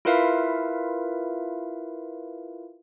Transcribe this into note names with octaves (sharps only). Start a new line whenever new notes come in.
E4 F4 A#4 B4 E5 F5